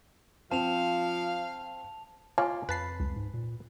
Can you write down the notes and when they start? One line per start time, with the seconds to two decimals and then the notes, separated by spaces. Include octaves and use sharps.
0.51 F3 C4 F5 A5 F7
2.38 F4 C#5 F5 G#5
2.69 F2 B4 A5 B5 C7
3.00 C#2
3.16 G#2
3.34 A#2